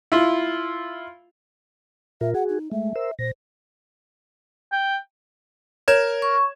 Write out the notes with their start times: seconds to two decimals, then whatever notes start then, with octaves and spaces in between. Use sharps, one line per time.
0.12 E4 F4
2.21 A#2 F4 A#4 E5
2.35 F#4 G#4 F#5
2.49 D#4
2.72 G#3 A3 E5
2.96 A#4 C5 E6
3.19 A#2 C5 A#6
4.72 G5
5.88 A#4 C#5 G#6 E7
6.22 C#6